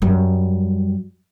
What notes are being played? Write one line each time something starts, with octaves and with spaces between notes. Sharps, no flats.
F#2 G3